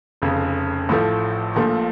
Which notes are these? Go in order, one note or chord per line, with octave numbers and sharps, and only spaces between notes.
F1 F2 C#3
A1 A2 F3 A3
A#1 A#2 F3 A3